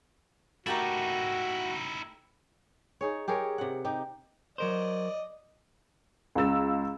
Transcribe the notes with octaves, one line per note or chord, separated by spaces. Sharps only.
A3 D#4 E4 F#4 G4 A#4
D#4 G#4 C#5
G4 G#4 A#4 C#5
C3 F#5
D#4 G4
F#3 A#4 C5 D5 D#5
C#2 F5 A#5 E6 A6 E7